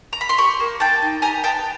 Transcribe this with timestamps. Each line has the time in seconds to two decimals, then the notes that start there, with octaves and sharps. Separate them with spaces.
0.13 A#5
0.21 B5
0.29 C6
0.38 G4 B5 C#6
0.60 A#3
0.80 A#3 G5 A5
1.02 D#4
1.22 G4 G#5 A#5
1.43 B3 G5 A5